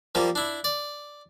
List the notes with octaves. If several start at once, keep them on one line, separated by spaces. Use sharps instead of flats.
F3 G3 A#3
D4 E4
D5